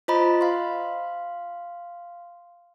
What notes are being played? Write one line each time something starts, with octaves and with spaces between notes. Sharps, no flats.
F4 C5 D#5 A#5 B5
F5 C6